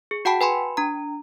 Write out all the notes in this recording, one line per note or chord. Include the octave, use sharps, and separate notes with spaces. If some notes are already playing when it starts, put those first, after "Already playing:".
G#4
F#4 F#5 G5 A5 B5
B4 G#5 B5 C6
D4 A#5